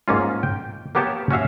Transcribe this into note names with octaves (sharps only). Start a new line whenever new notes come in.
G#2 A#3 C#4 F4
G5
A#3 B3 G4 C#5 A5
C#4 F#4 E5 F5